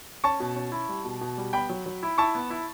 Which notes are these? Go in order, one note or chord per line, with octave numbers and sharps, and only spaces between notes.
C#4 A5 C#6
B2
C#4
E4
G3
B2
B2
G3
B3 G5 B5
F#3
F#3
E4
E4 A5 C#6
B3
E4